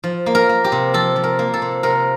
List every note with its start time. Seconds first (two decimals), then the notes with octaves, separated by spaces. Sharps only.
0.04 F3
0.26 A#3
0.35 A#4
0.49 A#3
0.64 G4
0.72 C3
0.94 F3 A4
1.16 F3
1.23 A#4
1.39 A#3
1.54 A4
1.62 C3
1.83 C3 A#4